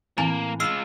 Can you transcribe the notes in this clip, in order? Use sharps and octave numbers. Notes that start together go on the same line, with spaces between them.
A2 E3 A#3 C4 F5 G#5
G#3 F4 E6 F6 C7